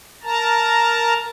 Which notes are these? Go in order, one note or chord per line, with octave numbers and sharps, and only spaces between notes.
A#4 A5 A#5